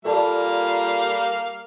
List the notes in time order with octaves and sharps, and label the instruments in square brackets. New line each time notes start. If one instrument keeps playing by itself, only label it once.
[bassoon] A#2 [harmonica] G3 A#3 F5 [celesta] A4 D5 A5